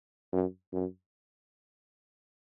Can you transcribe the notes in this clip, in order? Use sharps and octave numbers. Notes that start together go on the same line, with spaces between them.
F#2
F#2